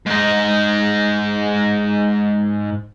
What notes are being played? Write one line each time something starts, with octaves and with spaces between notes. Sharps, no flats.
G#2 D#4